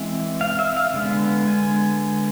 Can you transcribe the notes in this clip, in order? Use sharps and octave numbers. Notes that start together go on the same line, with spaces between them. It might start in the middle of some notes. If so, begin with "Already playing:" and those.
Already playing: E3 G#3 C4
F5
E5
F5
D3 G#3 B3
G#5